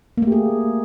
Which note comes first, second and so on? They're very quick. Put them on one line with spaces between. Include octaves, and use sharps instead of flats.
A#3 A3 G4 G#4